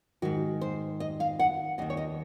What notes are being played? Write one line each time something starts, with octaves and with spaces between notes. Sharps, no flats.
G#2 D#3 F#4
C5
D#5
F5
F#5
D#2 D#3 D#5
C#5
D#5